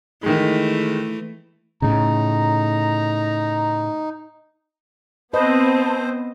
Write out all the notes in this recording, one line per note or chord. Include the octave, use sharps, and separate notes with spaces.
D#3 E3 G#3 A3
A2 C#3 D#4 A#5
B3 C4 B4 C5 D#5 A5